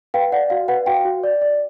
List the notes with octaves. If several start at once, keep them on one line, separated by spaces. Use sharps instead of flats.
B4 F5 G5
D5 F#5
F#4 F5
B4 F#5
F#4 F5 G5
F#4
D5
D5